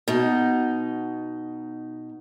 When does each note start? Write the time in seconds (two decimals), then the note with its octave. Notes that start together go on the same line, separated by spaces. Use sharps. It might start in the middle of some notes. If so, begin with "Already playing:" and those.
0.08 B2 D#4